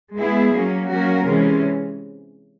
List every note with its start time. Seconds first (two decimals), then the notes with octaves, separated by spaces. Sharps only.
0.15 G#3 B3 E4 G#4
0.52 F#3 A#3 C#4
0.89 F#3 A#3 C#4 F#4 A#4
1.26 C3 E3 G#3 C#4